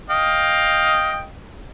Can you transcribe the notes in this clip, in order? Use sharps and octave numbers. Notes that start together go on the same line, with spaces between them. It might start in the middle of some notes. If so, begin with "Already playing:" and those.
D#5 F5 G5